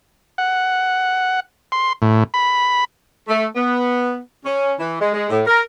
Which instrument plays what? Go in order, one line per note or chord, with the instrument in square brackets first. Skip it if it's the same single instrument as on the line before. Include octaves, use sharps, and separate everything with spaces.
[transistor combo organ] F#5
C6
A2
B5
[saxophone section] A3
B3
C#4
E3
G#3
G#3
A2
A#4